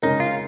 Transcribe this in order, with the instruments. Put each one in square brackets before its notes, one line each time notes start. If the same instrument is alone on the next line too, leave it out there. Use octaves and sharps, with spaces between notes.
[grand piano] C#3 G#3 C#4 A#4 [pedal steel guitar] D#4
[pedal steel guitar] F4